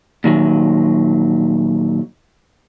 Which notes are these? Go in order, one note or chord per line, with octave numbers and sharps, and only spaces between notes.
A#2 D#3 F#3